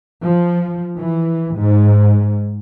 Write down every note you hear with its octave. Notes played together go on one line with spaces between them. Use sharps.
F3
E3
G#2